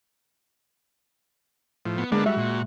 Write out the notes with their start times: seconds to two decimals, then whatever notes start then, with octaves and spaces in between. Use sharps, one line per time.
1.85 A2 F3
1.98 B3
2.12 D3 G#3 A#3 B3 D4
2.26 G3 F#4 E5
2.38 A#2